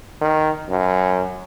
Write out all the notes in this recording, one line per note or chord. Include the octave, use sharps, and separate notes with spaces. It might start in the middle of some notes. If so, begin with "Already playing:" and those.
D#3
F#2